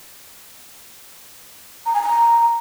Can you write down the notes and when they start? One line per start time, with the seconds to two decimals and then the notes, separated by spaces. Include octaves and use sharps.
1.86 A#5
1.94 G#5
2.02 A#5